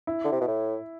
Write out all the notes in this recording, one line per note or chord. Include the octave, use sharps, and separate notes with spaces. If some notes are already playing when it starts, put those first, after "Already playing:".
E4
D3
C3
B2
A2